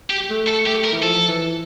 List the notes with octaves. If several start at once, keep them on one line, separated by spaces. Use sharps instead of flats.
G4
A3
A4
A3 G4
A#4
E3
F3 A4
E3